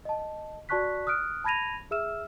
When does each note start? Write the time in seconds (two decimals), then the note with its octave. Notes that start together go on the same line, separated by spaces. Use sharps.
0.05 D#5 A5
0.69 F#4 D5 A5 C#6 F#6 B6
1.07 D#6 F6 F#6 D7
1.44 A5 B5 G#6 A#6 D#7 F7
1.91 G#4 E5 E6 F6 E7